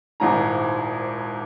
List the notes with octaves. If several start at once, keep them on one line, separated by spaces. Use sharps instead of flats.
D#1 G#1 G#2 E4 A#5